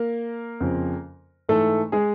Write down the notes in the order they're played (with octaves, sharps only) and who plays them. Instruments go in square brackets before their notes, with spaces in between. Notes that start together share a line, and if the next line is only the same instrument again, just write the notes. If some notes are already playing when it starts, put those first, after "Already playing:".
Already playing: [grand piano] A#3 A#4
F2 C#3 F3
G#2 E3 A3 A4
G#3 G#4